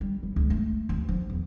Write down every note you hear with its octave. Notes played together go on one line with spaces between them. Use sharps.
G3
E3
C#2
A3
D2
F3
E2